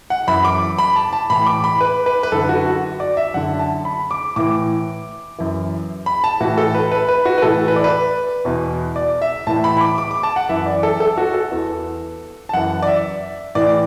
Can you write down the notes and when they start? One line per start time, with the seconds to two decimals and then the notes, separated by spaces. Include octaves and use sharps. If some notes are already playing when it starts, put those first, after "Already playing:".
0.10 F#5
0.27 F#2 E3 B5
0.44 D6
0.79 B5
0.96 A5
1.13 A5
1.30 A2 E3 B5
1.46 D6
1.64 B5
1.81 B4
2.06 B4
2.23 B4
2.32 F#2 D3 A4
2.49 F#4
2.66 F#4
3.00 D5
3.17 E5
3.34 F#2 D3 F#5
3.59 A5
3.85 B5
4.11 D6
4.36 A2 E3 D6
5.38 F#2 E3
6.06 B5
6.24 A5
6.40 A2 E3 F#4
6.58 A4
6.74 B4
6.92 B4
7.08 B4
7.25 F#4
7.38 B4
7.42 A2 E3 A4
7.68 B4
7.76 D5
7.84 B4
8.45 E2 B2
8.96 D5
9.22 E5
9.47 A2 E3 A5
9.64 B5
9.77 B5
9.81 D6
9.98 D6
10.11 D6
10.23 A5
10.36 F#5
10.49 F#2 E3 E5
10.66 D5
10.83 A4
11.00 A4
11.18 F#4
11.34 A4
11.51 E2 E3
12.49 A5
12.53 F#2 E3 F#5
12.82 D5
12.87 E5
13.55 A2 E3 D5